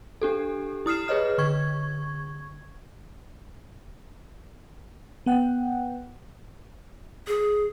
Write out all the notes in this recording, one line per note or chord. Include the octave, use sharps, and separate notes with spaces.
D4 G4 A4
E4 D#6 F6 C7 E7
G#4 B4 C#5 D#5 F6
D3 C#6 G#6
B3 F#5 G5
G#4